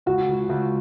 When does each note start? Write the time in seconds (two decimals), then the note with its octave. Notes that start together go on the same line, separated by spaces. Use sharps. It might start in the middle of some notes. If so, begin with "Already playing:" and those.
0.06 C#2 F#4
0.28 C#2
0.49 C#2